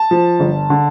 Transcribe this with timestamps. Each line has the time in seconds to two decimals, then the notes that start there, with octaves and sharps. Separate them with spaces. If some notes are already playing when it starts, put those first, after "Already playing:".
Already playing: A5
0.11 F3
0.40 G1
0.70 D3